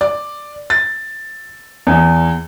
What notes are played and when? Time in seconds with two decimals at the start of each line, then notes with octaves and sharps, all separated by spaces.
0.01 D5
0.70 A6
1.87 E2